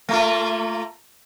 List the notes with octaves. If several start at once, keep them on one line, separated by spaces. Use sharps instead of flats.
A3 A#3 F4